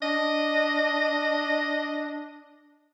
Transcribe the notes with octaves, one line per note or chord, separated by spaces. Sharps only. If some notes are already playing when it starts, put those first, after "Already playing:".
D4 D#5